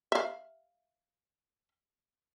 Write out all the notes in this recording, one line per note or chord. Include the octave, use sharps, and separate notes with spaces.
E5 F5